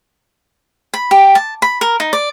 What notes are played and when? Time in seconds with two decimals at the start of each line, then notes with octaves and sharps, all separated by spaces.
0.94 B5
1.11 G4
1.35 A5
1.62 B5
1.81 A#4
2.00 D#4
2.13 D5